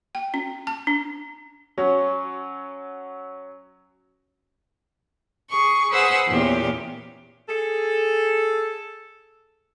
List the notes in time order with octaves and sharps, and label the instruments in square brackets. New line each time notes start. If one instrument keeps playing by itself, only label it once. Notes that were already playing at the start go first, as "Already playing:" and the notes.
[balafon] G5
C#4
A5
D4
[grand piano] F#3 C#4
[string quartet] G#4 C#6
G#4 B4 C5 F#5 E6
E2 A#2 C#4 G4
[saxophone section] G#4 A4